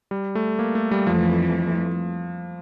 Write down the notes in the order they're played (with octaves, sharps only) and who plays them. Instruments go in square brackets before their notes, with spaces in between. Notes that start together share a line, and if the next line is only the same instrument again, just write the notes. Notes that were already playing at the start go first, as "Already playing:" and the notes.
[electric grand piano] G3
A3
A#3
A3
G3
[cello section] F2 E3 A3 [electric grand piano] F3